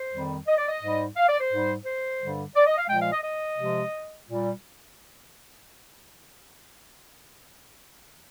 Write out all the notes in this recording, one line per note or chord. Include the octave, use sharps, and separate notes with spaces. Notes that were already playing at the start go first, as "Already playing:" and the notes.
Already playing: C5
F2 D#3 G3
D#5
D5
D#5
G#2 G3
F5
D5
C5
G#2 G3
C5
G2 D3 G3
D5
D#5
F5
A#2 F3 G#3 G5
F5
D#5
D#5
C3 F3 G#3
A#2 G3